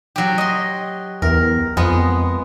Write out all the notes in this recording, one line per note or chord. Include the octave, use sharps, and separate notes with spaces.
F#3 G4
D#5 C6
E2 A#4
F2 G#3 B3